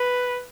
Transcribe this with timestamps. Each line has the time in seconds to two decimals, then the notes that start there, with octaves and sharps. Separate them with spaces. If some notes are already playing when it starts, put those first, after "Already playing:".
Already playing: B4